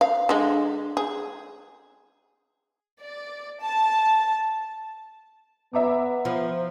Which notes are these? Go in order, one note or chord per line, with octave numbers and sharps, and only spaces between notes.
F5
D3 G#3
G#4
D5
A5
B3 B4 E5 A#5 D6
F3